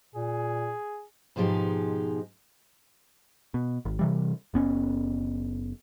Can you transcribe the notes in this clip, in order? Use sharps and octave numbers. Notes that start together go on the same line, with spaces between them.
A#2 G#4
G#2 B2 F3 G#3 D#4 G4
B2
G#1
C3 E3 G3
F#1 B3 C#4